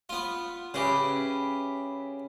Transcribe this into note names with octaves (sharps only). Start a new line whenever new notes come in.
B3 F4
C#3 G4 G#4 B4 E5